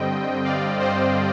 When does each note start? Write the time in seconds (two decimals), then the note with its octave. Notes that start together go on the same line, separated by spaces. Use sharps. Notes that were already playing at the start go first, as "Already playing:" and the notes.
Already playing: G2 D3 G3 C4 D#5 G5
0.45 D5 F5
0.79 C5 D#5